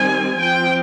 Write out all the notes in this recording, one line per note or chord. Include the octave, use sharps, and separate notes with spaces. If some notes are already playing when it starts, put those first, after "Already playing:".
Already playing: D#3 G3 C4 G#5
F3 C4 G5